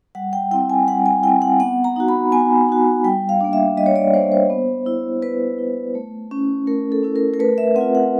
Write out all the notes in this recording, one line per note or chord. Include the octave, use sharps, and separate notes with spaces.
G3 F#5
G5
C4 E4 G5
G#5
G3 F#5
G#5
C4 E4 G5
F#5
B3 F#5
A#5
D#4 F#4
B5
B3 G#5
D#4 F#4
G3 G5
F5
A#3 D4
E5
G3 D#5
C#5
D5
A#3 D4 C5
C5
B3
E4
B3 B4
E4
A3
C#4 E4
A3 A#4
A4
C#4 E4
A#4
A#4
A3 B4
E5
C4 F4 F#5
F#5